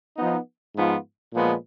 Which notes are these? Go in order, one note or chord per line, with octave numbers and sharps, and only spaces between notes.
F3 B3 D#4
G#2 F3 B3 F4
A#2 F3 G#3 B3